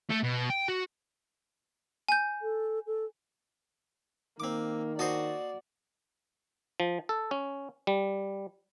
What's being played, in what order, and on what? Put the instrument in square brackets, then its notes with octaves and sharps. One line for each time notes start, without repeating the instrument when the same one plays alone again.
[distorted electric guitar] A3
B2
G5
F#4
[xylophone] G#5 G6
[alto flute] A4
A4
[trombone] D#3 [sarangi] A#3 [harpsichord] C4 D6
[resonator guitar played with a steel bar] F#4 [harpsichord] C5 D#5 A5 [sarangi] D5
[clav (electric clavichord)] F3
A4
C#4
G3